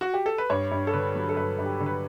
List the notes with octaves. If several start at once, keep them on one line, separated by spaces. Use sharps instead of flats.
F#4
G4
A4
B4
G2 C#5
G2
A4
D3 B4
F#3
A4
G2 B4
G2
G4
D3
B4